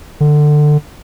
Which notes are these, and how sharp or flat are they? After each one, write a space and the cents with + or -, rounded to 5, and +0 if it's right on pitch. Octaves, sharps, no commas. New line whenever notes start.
D3 +20